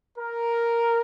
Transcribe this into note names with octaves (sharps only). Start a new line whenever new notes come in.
A#4